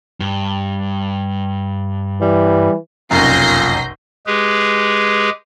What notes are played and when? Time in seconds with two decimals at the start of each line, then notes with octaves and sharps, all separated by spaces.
0.20 G2
2.21 E3 G3
3.11 F1 B1 F#2 A#2 G6 A#6 C7
4.27 G#3 G4 G#4 B4